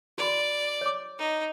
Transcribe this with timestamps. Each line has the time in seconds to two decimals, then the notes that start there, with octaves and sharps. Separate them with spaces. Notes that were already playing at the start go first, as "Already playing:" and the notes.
0.18 F#4 D5 B5
0.81 C#5 D6
1.19 D#4